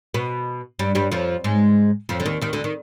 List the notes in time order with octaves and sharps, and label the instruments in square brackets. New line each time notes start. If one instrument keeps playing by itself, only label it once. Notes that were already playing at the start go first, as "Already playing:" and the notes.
[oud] B2 B3
G2 G3
G2 G3
F2 F3
G#2 G#3
F2 F3
D3
D#2 D#3
D#2 D#3
D2 D3
D#3